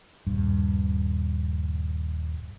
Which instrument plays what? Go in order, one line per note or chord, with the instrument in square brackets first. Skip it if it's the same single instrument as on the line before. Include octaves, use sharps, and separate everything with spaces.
[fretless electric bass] D#1 G2